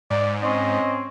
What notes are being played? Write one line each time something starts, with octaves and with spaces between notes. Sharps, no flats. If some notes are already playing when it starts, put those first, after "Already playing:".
G#2 D5
C4 C#4 D#5